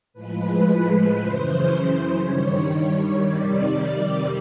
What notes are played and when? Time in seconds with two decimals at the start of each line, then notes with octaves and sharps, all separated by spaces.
0.13 A2 F3 G#3 B4
1.17 F#2 C#3 E3 C5
2.21 G2 D#3 G3 C#5
2.74 C#5
3.25 F2 C3 D#3 G3 D5